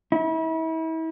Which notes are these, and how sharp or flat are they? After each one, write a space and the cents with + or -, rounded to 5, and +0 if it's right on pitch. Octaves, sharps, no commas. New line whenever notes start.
E4 -35